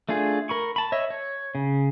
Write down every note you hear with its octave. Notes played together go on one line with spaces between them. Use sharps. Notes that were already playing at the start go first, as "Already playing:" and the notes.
A3 D4 F4 G#4
A#4 B5 C#6
A5 B5
C#5 D#5 E5
C#5
C#3